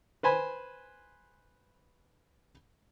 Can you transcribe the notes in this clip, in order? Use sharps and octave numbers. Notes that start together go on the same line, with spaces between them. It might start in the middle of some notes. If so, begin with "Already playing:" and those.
B4 C5 G#5 B5